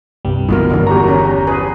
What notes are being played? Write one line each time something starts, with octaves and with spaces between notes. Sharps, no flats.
C2 G2 G3
G1 B2 E3 A3 F4 A#4
D#3 F#3 D4
E2 F#4 G4 A#5 C#6
C#4 D4
F3 G#4 B4